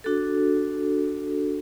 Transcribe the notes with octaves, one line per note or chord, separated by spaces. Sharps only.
D4 F#4 A4